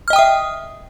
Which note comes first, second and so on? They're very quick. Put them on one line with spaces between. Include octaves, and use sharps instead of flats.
F6 D#5 G5 D#6 E5